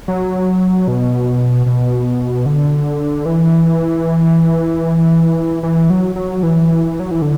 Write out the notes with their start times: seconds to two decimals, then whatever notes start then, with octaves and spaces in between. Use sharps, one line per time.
0.08 F#3
0.88 B2
1.66 B2
2.46 D3
3.26 E3
5.63 E3
5.90 F#3
6.16 F#3
6.43 E3
7.00 F#3
7.11 E3
7.22 D3